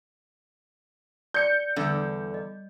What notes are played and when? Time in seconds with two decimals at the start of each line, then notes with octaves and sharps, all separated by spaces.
1.34 D5 G6 C#7
1.76 E2 D3 G3
2.34 D#5